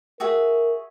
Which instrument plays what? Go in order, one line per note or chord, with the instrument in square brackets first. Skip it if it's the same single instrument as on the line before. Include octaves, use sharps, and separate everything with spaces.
[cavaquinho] F#4 G#4 E5 [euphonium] A#4